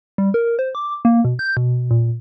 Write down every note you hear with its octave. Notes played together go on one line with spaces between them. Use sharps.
G3
A#4
C5
D6
A#3
B2
G6
B2
A#2